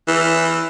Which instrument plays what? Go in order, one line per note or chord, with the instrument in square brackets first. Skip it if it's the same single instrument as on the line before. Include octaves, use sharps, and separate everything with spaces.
[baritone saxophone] E3